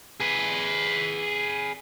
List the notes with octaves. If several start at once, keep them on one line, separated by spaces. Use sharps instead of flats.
G#4 B4